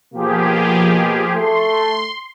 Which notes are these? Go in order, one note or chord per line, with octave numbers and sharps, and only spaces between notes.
B2 F3 A#3 G4 G#4
A3 C6